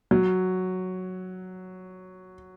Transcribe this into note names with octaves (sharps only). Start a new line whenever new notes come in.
F#3